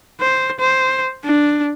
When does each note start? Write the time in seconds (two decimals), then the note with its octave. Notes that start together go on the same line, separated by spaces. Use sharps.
0.20 C5
0.60 C5
1.24 D4